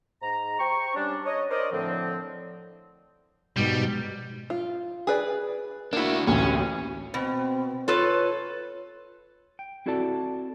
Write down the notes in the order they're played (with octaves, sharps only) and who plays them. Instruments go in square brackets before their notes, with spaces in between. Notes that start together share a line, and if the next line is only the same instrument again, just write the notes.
[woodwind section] G#2 A#5
C5 G5 C#6
G3 C#4 D4
C#5 D#5
A#4 C5 D5 D#5
A2 D3 F3 C4
[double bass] G#2 B2 [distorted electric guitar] G3
[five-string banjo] F4
G#4 B4 D5
[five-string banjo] A#3 E4 [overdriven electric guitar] D4 F#4
[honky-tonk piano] A1 D2 A2 [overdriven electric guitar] C#4
[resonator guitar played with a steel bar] B2 [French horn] C4
[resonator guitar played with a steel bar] F4 A4 B4 [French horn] C#5
[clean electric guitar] G5
C4 E4 F#4 A4 D5 A5